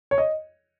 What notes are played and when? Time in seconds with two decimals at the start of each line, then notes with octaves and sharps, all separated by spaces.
0.11 C#5
0.18 D#5